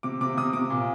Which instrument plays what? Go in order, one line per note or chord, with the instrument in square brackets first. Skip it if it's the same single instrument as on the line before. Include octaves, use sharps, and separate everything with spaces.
[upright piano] C3 D6
C3 D6
C3 D#6
C3 D6
A#2